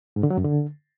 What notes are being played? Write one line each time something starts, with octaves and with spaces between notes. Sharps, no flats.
G#2
D3
F#3
F#2
D3